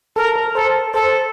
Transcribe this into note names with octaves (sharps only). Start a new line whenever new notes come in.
A4 A#4
A#4
A4 C5
A4 C5